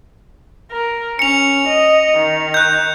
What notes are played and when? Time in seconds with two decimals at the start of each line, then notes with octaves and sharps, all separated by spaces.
0.71 A#4
1.19 C#4 C#7 F7
1.68 D#5
2.18 D#3
2.54 F#6 G6